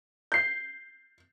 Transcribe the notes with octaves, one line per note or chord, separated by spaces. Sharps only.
G6 C7